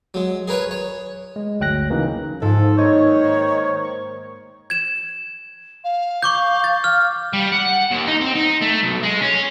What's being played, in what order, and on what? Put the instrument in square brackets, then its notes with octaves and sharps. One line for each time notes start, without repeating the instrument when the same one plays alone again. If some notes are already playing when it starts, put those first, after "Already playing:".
[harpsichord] F#3 G#3
G#4 A#4 B4 C#5 G#5
C#5
[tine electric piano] G#3
G1 D2 F#3 G5 F#6 A#6
C#3 E3 F#3 A#3 C#4 D#4
[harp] G#2 [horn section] F3 A4
[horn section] D#3 D#4 C#5 [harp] A#3 D#5 G6
[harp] C5
C#6
[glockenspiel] G#6 E7
[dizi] F5
[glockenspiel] C#6 D6 G6
A6
F6
[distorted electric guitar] G3
F#5
D#2
D#4
C4
D#4
A3
B1
G#3
C#4